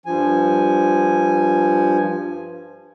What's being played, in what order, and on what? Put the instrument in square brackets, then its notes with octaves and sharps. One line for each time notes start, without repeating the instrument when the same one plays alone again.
[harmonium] G2 F3 G#5